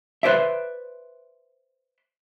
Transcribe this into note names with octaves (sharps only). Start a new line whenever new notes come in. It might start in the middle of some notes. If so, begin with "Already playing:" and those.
B4 C5 D5 E5